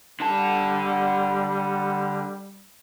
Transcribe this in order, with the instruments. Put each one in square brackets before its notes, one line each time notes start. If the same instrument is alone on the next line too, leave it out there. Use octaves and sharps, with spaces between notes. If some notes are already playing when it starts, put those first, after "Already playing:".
[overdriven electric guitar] D3 A5 [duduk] G3